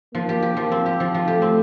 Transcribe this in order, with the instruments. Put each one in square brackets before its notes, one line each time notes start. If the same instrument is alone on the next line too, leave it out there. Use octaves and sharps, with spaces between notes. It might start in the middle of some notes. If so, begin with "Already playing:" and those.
[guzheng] F3 [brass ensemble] A#3
[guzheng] G4
G4
F3
C4
G4
F3
F3
[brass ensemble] A3 [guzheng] G4
[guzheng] C4